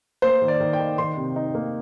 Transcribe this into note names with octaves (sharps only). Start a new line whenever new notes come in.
A#3 C5
D#3
D5
D#3
G5
D#4
D#3 C6
C3
D#4
A#3